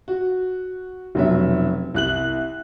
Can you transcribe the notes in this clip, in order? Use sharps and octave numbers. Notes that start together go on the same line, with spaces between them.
F#4
F1 B2 F#3 C#4 E5
C2 F#6 F#7